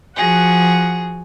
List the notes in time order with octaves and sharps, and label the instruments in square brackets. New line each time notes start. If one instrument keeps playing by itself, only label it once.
[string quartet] F3 F#4 G#4 F#5